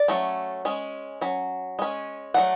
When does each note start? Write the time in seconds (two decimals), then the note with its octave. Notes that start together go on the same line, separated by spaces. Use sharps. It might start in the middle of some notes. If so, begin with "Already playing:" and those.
Already playing: D5
0.08 F#3 A3 C#4
0.65 G#3 C#4
1.21 F#3 C#4
1.79 G#3 C#4
2.34 F#3 A3 D4 F#5